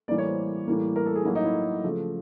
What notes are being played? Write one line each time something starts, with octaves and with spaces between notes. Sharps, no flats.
A2 E3 G3 A#3 D5
C#5
C5
A2 E3 G3 A#3
A#4
A4
G#4
A2 F#3 A#3 E4
D#4
E4
C#3 F3 A3